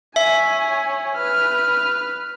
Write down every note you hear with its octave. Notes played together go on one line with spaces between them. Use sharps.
C#5 E5 G#5
B4 F6